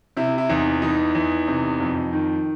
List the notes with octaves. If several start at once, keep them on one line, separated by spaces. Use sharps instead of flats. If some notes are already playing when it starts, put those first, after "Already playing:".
C3 E4
E4
E2 D#4
E3 D#4
E2
C3
F2
D#3